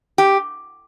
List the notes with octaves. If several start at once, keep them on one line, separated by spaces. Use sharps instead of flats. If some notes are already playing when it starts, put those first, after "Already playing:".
G4